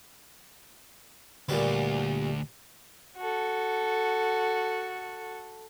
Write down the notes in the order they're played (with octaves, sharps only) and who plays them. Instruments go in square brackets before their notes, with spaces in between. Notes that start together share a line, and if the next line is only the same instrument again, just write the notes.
[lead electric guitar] D2 [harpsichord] A#2 G3 B4
[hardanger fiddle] F#4 A4